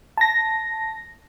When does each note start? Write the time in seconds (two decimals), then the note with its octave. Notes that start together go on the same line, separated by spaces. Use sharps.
0.17 A5 A#6